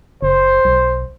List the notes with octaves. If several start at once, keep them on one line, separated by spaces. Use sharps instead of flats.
F#1 C5
B1